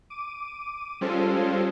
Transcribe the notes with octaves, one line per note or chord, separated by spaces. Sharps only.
D6 D#7
G3 G#3 C#4 F4 A4 C5